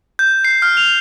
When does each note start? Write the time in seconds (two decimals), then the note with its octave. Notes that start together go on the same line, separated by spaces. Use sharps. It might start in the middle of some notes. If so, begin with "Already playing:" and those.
0.19 G6
0.45 C7
0.62 F6
0.77 F7